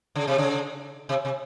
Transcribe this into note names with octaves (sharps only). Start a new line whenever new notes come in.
C#3
C3
C#3
C3
C3